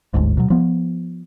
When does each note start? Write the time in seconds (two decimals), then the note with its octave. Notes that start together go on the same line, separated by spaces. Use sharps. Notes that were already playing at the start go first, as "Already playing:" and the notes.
0.14 G1 D2 G#2
0.37 B2 F#3
0.50 F3 B3